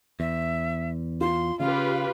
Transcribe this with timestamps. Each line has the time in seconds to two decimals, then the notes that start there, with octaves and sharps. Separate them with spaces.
0.20 E2 E5
1.21 F4 C6
1.60 C#3 F4 G4 B4 F5